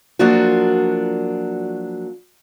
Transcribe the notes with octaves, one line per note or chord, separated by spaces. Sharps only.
F3 F#3 A#3 D4 F4 F#4